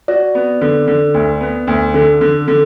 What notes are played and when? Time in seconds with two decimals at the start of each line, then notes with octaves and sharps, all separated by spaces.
0.08 F#4 D5
0.35 B3
0.61 D3
0.87 D3
1.14 D2
1.41 B3
1.67 D2
1.94 D3 A4
2.21 D3
2.48 D3